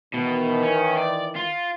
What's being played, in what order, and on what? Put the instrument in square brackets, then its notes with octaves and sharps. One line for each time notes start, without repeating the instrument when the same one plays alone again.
[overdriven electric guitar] B2 [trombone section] D#3 E3
[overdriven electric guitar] C#4
D5
F4